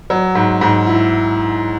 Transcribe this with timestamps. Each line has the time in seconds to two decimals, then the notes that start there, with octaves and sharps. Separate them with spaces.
0.10 F#3
0.35 G#2
0.61 G#2
0.87 E4